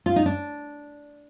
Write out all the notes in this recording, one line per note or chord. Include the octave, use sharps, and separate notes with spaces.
F4
D#4
D4